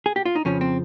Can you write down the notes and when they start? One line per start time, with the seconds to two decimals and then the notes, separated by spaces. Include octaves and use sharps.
0.06 G#4
0.16 G4
0.25 F4
0.35 D#4
0.45 F2 C#3 F3 C#4
0.61 C4